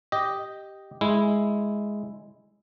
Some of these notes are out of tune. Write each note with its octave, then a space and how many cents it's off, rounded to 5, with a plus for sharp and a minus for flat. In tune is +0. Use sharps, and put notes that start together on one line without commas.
G4 +0 D#5 +0
G#3 +0 E4 +0